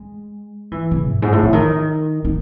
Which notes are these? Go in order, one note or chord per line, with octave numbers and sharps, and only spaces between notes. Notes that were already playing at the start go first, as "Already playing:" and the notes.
Already playing: G#3
E3
C#3
F#2
G#2
A2
C#3
D#3
D#3